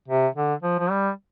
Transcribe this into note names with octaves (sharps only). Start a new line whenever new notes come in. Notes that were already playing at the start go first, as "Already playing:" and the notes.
C3
D3
F3
F3
G3